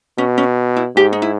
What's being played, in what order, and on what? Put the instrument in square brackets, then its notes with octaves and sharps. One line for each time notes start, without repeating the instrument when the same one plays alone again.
[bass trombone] B2 [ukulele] C#4
[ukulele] C#4
E4
[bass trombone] G#2 [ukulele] G4
[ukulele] D#4
E4